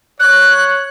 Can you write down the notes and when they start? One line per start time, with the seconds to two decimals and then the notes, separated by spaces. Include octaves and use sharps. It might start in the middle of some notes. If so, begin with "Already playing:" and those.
0.20 C#5 F#6